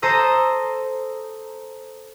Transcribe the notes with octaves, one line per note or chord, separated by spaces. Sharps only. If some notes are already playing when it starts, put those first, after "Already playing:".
A4 C5 A#5 D#6 E6